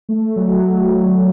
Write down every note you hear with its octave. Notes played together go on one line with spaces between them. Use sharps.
A3
F#3